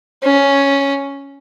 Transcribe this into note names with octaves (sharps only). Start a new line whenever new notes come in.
C#4